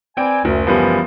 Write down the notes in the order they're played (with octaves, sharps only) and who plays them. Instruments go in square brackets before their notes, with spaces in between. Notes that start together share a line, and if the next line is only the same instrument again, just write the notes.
[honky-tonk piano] C4 G5 D7 [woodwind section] B4 D5 G#5
[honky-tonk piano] F#1 [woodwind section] D2
[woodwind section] E3 [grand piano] F3 G3 B3